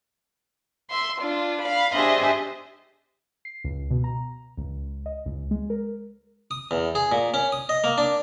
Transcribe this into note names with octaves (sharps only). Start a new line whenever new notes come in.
E5 C6
D4 F4
F5 B5
D4 G4 G#4 C5 D#5 E5
C7
C#2
B2
A#5
C#2
D#5
C#2
G#3
A#4
D#6
E2
G#4
A#2
C#4
D#6
D#5
A#3
D4